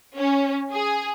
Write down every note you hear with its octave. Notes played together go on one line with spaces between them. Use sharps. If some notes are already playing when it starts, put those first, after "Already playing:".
C#4
G#4